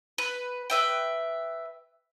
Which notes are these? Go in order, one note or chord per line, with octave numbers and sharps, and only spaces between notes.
B4
B4 E5 G5